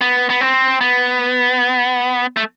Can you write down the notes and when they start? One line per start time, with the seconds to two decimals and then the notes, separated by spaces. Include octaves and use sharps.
0.01 B3
0.30 B3
0.41 C4
0.81 B3
2.37 A3